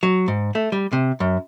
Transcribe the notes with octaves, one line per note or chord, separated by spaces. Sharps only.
F#3
G#2
A3
G3
C3
F#2